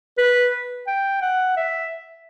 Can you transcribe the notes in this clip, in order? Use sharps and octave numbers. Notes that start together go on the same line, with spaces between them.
B4
G5
F#5
E5